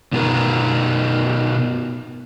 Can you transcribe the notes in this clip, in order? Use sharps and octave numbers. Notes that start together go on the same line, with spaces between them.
B2 B3 D#4 A#4